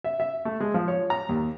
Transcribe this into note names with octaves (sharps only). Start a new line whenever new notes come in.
E5
E5
A3
G#3
F3
C#5
A#5
D#2